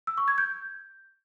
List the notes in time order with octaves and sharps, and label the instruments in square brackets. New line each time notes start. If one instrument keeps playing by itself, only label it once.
[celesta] E6
C#6
G#6
G6